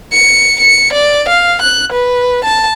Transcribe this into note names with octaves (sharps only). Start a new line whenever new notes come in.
C#7
C#7
D5
F5
F#6
B4
A5